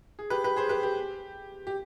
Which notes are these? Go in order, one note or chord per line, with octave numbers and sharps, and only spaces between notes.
G#4
G4 B4
G4 B4
G#4 C5
G4 B4
G4
G4